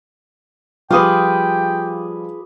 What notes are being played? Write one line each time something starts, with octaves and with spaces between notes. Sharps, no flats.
F3 G3 F4 G#4 B4 G5 D6 D#6